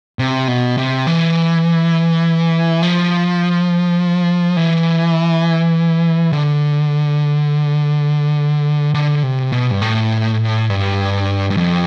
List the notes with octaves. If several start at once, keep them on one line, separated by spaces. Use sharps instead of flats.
C3
B2
C3
E3
F3
E3
D3
D3
C3
B2
G2
A2
G2
G2
F2